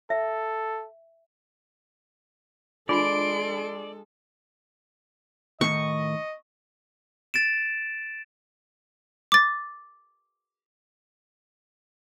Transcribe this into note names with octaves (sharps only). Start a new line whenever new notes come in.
A4 E5
G#3 D4 F4 A4 D5 B5 C6 D7
A2 D#3 D#5 C#6
A6 D7 E7
D6 A6